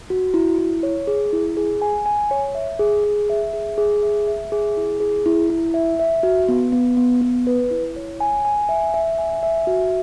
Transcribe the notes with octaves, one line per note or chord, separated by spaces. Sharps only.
F#4
E4
E4
C#5
G#4
E4
G#4
G#5
G#5
C#5
E5
G#4
G#4
E5
G#4
G#4
E5
E5
G#4
E4
G#4
E4
E4
E5
E5
F#4
B3
B3
B3
B3
B4
E4
C#5
G#5
G#5
E5
E5
G#5
E5
F#4